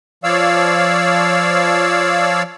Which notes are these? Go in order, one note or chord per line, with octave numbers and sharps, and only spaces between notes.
F3 C#5 D5 F5 E6